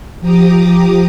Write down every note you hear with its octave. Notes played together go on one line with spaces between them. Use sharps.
F3 G4 A#5 D6 D#6